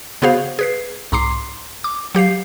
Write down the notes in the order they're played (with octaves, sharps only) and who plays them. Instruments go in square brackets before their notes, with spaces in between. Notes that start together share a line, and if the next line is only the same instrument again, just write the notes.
[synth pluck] C#3 B3 F#4 G#4 C5 F5
G#4 B4 C7
C2 G#2 A#5 C6 D6 C7
D6
F#3 G4 F5 C7